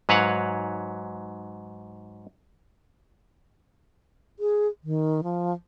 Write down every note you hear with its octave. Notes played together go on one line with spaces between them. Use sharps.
G#2 F#3 B4 C#5 F5 F#5
G#4
D#3
F3